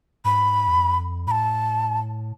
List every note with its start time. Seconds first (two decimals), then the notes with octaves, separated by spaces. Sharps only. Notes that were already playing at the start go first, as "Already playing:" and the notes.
0.24 G#2 B5
0.67 E2
0.76 F2
1.27 A2 B5
1.31 A5